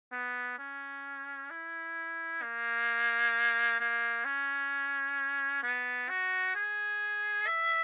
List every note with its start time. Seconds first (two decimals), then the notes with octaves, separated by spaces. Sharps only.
0.12 B3
0.59 C#4
1.51 E4
2.42 A#3
3.80 A#3
4.25 C#4
5.63 B3
6.09 F#4
6.55 G#4
7.47 E5